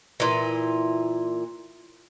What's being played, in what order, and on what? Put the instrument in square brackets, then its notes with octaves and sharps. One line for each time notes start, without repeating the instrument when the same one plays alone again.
[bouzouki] A#2 E3